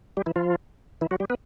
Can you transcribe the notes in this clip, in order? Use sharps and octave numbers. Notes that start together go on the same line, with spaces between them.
G3 G4
E3 E4
F3 F4
E3 E4
F#3 F#4
G3 G4
B3 B4